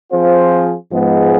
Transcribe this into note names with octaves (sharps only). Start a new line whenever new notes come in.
F3 C4 F4 G#4 C5
G#2 F3 G#3 B3